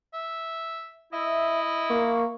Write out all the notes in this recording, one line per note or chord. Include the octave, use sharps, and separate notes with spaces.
E5
E4 D#5 E5
A#3 C#6